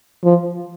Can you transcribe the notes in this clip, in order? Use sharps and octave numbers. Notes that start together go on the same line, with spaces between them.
F3